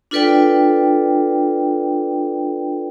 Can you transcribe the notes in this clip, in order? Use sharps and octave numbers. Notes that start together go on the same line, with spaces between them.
D4 F4 A4 B4 D5 G5